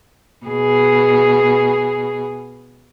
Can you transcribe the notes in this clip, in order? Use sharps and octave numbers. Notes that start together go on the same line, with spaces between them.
B2 G#4